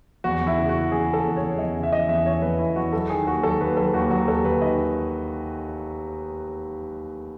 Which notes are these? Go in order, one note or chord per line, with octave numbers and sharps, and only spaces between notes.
E2 F#4
E2
E4
C#3
F#4
C#3
E2 G#4
E2 A4
E2
E2 C#5
E2 D#5
C#3
E5
E3 D#5
E2 E5
E3 C#5
E2 B4
E2 E4
E2 F#4
F#3 A4
D#3 G#4
D#2 F#4
F#3 A4
D#2 B4
F#3 A4
D#2 F#4
F#3 F#4
D#2 A4
D#2 B4
D#3 D#5